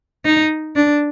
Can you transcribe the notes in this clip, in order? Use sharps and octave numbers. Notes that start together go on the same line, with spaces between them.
D#4
D4